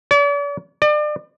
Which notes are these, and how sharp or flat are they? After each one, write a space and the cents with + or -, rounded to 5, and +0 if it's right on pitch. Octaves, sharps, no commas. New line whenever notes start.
D5 -45
D5 +35